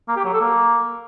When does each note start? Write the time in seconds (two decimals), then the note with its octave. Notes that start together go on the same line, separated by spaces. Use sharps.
0.08 A#3
0.16 G4
0.24 F#3
0.32 A4
0.41 A#3